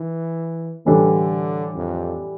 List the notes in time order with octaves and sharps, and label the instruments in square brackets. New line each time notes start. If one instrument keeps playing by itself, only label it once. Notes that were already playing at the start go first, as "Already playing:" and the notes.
Already playing: [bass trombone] E3
[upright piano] A2 E3 G3 D4 A4 [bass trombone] D3
[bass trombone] F2